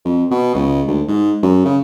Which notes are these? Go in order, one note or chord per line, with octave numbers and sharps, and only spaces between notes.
F2
B2
C#2
D2
G#2
F#2
C#3